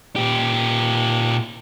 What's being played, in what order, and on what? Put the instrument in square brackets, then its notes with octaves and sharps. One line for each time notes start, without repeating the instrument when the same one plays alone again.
[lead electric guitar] A#2 G4